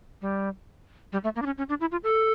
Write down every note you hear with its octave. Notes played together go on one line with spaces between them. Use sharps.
G3
G3
A3
A#3
D4
C#4
C#4
D4
E4
F4
A4